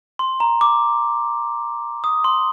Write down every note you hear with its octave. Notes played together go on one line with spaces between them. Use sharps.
C6
A#5
D6
D#6
C6